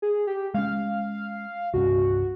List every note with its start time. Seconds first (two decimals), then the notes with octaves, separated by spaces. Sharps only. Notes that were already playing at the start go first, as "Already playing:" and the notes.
0.02 G#4
0.27 G4
0.54 G#3 A#3 C#4 F5
1.74 C2 G2 C#4 F#4